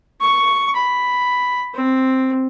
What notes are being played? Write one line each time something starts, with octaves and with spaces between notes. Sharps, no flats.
C#6
B5
C4